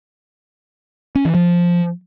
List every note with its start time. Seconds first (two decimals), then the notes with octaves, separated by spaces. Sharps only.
1.15 C#4
1.25 E3
1.35 F3